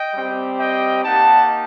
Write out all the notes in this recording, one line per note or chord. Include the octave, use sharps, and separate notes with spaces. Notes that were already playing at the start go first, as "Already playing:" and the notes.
Already playing: D#5 G5
G3 C4 G4
D#5 G5
A#3 D#4 G4 F#5 A5